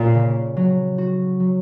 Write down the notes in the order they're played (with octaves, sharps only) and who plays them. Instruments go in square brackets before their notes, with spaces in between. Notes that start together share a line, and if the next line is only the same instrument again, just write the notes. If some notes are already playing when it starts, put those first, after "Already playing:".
Already playing: [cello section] A#2 [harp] C#4
[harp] C#3
F#3
F#4
F#3